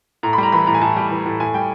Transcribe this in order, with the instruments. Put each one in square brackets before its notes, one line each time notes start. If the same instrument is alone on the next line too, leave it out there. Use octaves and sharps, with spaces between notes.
[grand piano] A2 A#5
B5
G3 A#5
E3 B5
A2 A#5
G#5
A2 A5
G3
E3
A2
A2 G#5
G3 G5